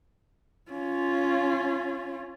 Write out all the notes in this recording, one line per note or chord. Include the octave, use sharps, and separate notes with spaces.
C#4 F4